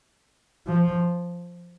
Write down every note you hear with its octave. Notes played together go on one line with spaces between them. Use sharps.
F3